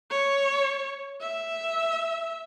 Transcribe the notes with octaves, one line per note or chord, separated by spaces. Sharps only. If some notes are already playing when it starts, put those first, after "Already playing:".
C#5
E5